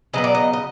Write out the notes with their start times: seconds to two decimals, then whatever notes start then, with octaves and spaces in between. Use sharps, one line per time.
0.13 C#3 F#3 B3 D#5
0.24 D5
0.35 D#5
0.53 D#5